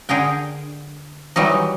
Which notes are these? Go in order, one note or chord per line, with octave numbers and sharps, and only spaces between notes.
D3 G#4 A#4 G5
D#3 E3 F#3 G3 D#4